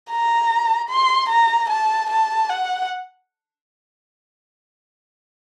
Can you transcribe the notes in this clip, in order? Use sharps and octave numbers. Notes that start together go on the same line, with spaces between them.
A#5
C6
A#5
A5
A5
F#5